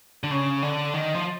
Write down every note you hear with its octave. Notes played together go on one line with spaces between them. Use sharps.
D3
C#3
D3
D#3
F3